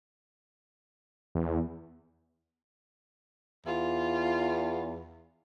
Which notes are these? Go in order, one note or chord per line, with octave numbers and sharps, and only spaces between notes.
E2
E2 F4